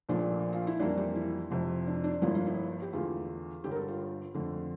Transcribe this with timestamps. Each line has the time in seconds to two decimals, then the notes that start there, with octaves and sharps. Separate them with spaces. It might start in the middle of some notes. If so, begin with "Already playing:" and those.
0.09 A#1 A#2 F3 A3 D4
0.53 F4
0.67 E4
0.80 F2 E3 G3 A#3 D4
0.98 G4
1.16 E4
1.51 F1 F2 C3
1.87 D4
2.04 D4
2.21 G1 G2 F3 A#3 E4
2.35 F4
2.47 E4
2.82 G4
2.93 E2 D3 A3 F4
3.64 G1 G2 D3 G4
3.71 A#4
3.76 A4
3.88 F4
4.34 F2 D3 A3